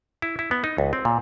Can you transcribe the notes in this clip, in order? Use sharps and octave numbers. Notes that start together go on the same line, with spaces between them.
E4
E4
B3
D#4
C#2
C4
A#2